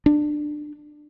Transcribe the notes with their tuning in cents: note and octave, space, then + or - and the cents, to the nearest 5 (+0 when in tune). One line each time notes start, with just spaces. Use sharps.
D4 +20